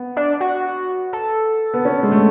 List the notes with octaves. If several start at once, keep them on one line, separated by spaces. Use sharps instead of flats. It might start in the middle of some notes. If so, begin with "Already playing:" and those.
Already playing: B3
D4
F#4
A4
B3
C#4
G#3
A3